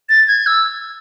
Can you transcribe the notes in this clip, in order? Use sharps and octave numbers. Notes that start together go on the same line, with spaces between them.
A6
G#6
E6